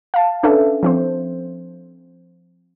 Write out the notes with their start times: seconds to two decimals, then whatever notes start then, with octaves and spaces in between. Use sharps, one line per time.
0.14 F5 A5
0.43 C#4 D4 A4 B4 E5
0.83 F3 C4 C5